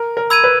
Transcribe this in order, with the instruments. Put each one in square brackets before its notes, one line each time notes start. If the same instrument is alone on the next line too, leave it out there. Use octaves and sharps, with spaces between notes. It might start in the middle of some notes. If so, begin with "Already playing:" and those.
Already playing: [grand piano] A#4
A#4
[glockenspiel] B5 E6 G#6 D#7
[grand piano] B4